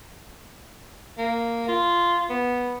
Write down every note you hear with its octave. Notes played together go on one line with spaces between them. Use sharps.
A#3
F4
B3